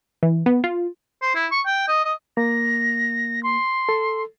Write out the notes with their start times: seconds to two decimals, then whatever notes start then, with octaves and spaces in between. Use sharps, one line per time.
0.23 E3
0.46 B3
0.64 F4
1.22 C5
1.35 E4
1.51 C#6
1.66 G5
1.89 D#5
2.05 D#5
2.37 A#3 A#6
3.43 C6
3.89 A4